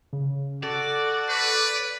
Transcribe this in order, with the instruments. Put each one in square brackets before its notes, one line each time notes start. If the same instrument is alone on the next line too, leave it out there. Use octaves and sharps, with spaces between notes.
[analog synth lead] C#3
[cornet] F#4 [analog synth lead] A4 [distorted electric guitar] D5
[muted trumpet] B4